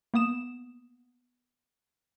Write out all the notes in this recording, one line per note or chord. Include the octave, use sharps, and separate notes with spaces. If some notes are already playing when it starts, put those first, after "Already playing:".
A#3 B3 D#6 E7